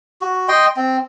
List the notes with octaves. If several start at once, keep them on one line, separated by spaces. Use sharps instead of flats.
F#4
D#5 G5 C6
C4